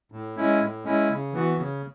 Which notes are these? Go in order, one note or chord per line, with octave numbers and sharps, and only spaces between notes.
A2
G#3 C#4 E4
A2
G#3 C#4 E4
C#3
E3 B3 F#4
C#3